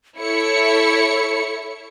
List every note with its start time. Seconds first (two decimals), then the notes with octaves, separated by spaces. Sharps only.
0.18 E4 A4 C#5 C#7